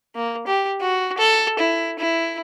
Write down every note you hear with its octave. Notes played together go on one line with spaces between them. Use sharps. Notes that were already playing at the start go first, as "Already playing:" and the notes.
A#3
G4
F#4
A4
E4
E4